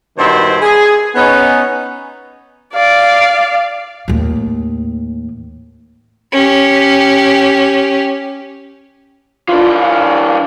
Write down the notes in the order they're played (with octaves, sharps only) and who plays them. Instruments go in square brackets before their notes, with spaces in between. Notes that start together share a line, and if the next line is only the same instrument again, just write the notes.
[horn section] G2 B2 D#3 E4 C5
G#4
B3 C#4 D#4
[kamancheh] D5 F5
[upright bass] D#2 A2
[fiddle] C#4 G4
[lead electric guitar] E3 D4 [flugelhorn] F4
[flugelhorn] F5